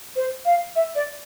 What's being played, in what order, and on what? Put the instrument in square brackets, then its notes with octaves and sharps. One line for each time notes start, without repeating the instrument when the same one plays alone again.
[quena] C5
F5
E5
D5